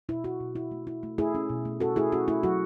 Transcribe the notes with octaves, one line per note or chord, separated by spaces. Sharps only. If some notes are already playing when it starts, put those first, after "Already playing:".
B2 E4
E4 F#4
B2
E4
A3
E4
A3
A3 E4 G#4
C#4
B2
A3
C#4 F#4 A4
A3 E4 G#4
C#4 F#4
A3 E4
F#3 F#4